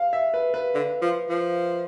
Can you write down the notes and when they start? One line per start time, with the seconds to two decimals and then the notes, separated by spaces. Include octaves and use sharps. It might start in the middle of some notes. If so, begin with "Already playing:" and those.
Already playing: F5
0.13 E5
0.34 B4
0.54 B4
0.75 D3
1.02 F3
1.29 F3